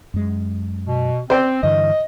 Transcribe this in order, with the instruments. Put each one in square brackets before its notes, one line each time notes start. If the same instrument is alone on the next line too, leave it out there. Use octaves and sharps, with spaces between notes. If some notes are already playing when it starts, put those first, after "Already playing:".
[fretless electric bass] F#2 G#3
[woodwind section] B2
[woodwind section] C4 [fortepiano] C5 D5 G5
[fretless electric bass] G2 D3 E3 [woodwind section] D#5